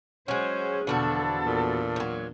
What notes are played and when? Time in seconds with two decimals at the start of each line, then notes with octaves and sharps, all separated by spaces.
0.28 F#3 G#3 C#4 C5
0.87 E2 B2 D3 F3 D4 F#4 A4
1.46 A#2
1.96 F3 F#3